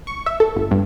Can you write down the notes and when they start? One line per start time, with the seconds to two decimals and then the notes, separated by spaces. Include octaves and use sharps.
0.07 C#6
0.26 E5
0.40 A4
0.56 G1
0.71 G2